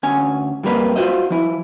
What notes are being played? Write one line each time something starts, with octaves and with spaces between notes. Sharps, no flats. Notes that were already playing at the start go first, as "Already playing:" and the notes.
D2 C#4 G#5
F2 G3 A#3 B4
F4 F#4 G#4 C5 D#5
F3 E4